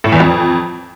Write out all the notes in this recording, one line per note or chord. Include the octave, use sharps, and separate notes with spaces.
A2
E2
F2